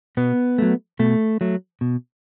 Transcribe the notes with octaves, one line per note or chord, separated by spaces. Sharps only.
B2 B3
F#3 A3
B2 A3
F#3 A3
B2